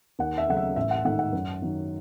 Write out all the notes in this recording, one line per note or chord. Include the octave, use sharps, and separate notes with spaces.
D#2 F#5
E5
C#3 F#3 A3 D#4 F#5
E5
A1 E5
F#5
G#2 D#3 A3 D#4 F#5
F#5
F#2
D#3 F#3